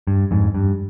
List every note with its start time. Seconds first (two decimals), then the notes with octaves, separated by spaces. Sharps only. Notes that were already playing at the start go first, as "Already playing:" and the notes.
0.07 G2
0.31 F2 G#2
0.55 G2